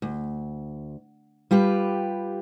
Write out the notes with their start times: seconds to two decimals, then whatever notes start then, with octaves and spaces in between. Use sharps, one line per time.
0.02 D2
1.51 G3 F4 G4 B4